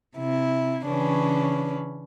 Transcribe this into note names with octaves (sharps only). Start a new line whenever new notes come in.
C3 E4
C#3 E3 C#4 D4 B4